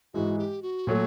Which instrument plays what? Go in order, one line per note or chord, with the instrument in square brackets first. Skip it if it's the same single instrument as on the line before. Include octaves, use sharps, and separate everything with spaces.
[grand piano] G#2 E3 G#3 [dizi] F#4
[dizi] G4
F#4
[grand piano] A#2 F#3 A3